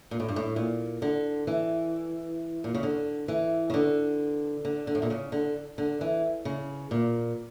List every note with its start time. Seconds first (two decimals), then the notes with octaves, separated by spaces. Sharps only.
0.11 A#2
0.20 A2
0.28 G2
0.36 A2
0.56 A#2
1.02 D3
1.47 E3
2.64 A#2
2.74 C#3
2.83 D3
3.28 E3
3.70 C#3
3.74 D3
4.65 D3
4.87 D3
4.95 A2
5.02 A#2
5.10 C#3
5.32 D3
5.78 D3
6.01 E3
6.45 C#3
6.91 A#2